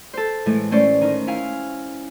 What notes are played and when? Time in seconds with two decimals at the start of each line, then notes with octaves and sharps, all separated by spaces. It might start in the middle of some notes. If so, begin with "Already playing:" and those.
0.14 A4 C5
0.46 A2 E3 G#3 A3
0.71 A3 C#4 C5 D5
1.01 D#3 D#4
1.27 E4 F5 G#5